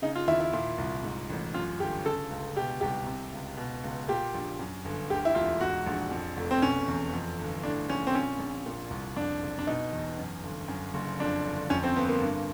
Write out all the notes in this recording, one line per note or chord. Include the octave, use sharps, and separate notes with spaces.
C#3 D#4
F4
D#2 E4
E4
A#2
C2
G#2
A1
F#2 F4
G1 G4
C#3 A4
C#2
B2 G4
C2 G4
C3
C#2
B2
C#2
A#2 G4
A#1
F#2
G1
D2 G4
E4
E1 F4
G#2 F#4
A#1
F2
F1
C4
B2 C#4
E2
F2
G1
A2 D4
A#1 C#4
C4
A#2 C#4
A#1
A#2
C2
F2 D4
F#1
D4
B2 D#4
E2
F#2
G1
F#2
F#1
F2 D4
G1
F2 C#4
C4
G1 B3
A#3
G2